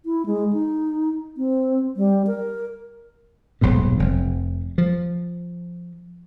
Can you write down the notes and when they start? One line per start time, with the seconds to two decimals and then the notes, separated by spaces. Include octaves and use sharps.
0.05 E4
0.26 G#3
0.53 D#4
1.37 C4
1.97 G3
2.27 A#4
3.61 D#1 B1 G#2 B2
3.98 F1 C3
4.78 F3